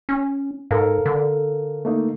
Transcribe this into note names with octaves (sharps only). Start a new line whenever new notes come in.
C#4
G#2 A4 A#4 F5
D3
A3 A#3 D#4